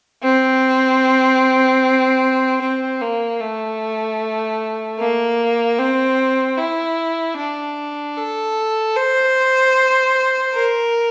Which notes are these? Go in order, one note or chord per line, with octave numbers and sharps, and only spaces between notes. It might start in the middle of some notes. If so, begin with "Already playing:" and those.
C4
C4
A#3
A3
A#3
C4
E4
D4
A4
C5
A#4